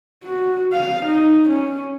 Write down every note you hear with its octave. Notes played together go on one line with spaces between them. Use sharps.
F#4
F5
D#4
C#4